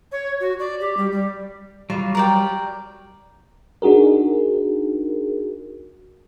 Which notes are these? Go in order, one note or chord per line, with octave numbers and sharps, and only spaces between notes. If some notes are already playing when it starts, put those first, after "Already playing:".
C#5
F#4
D5
G4
G3
G3
F#3 G3 F4
A#4 D5 G5
D4 D#4 F#4 G#4 A#4